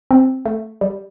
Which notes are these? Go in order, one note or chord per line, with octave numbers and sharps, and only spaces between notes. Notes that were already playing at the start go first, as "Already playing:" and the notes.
C4
A3
G3